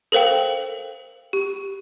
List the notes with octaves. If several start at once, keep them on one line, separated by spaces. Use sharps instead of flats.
A4 A#4 C5 F5 G5
G4